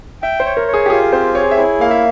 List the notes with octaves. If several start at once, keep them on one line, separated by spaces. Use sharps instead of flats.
E5 G5
C5
C#5
A#4
C#5
G#4
G4
F4 G#4
C4 C5
G#4 C#5
E5
E4 C#5
A#3 F5
E5